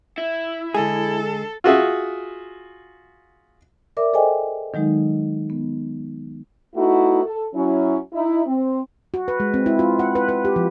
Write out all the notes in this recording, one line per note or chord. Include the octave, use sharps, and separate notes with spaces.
E4
D3 G#3 G#4 A4
F4 F#4 G#4 E5
A#4 D5 E5 D6
G#4 A4 C5 D#5 G5 G#5
D#3 F#3 G#3 D#4
B3
A3 B3 D#4 E4 F#4
A4
F#3 C#4 E4
D#4 E4
C4
F#4
B4
G#3
C4
E4
F4
F#5
B4
B4
G4
F3